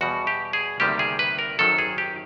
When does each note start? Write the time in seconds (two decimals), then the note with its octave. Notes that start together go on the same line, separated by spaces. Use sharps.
0.01 E2 B2 G3 F#4
0.27 G4
0.53 G#4
0.80 D2 C3 D#3 G3 A#3 G4
0.99 G#4
1.19 B4
1.39 A#4
1.59 G#1 F#2 D#3 F#3 A4
1.78 G#4
1.98 G4